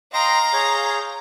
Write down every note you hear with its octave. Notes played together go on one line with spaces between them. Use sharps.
D#5 F5 G5 A#5 C6
G#4 C#5 G6